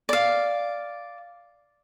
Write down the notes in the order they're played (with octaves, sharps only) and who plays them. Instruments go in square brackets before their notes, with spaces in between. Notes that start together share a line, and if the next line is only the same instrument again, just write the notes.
[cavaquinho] D5 F5